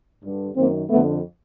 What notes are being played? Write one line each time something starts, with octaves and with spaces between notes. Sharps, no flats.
G2 D3
F#2 D#3 A#3 C4
F2 D3 A3 B3